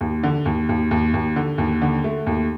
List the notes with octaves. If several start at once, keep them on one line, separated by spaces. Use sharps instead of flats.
D#2
D3
D#2
D#2
D#2
D#2
D3
D#2
D3
A3
D#2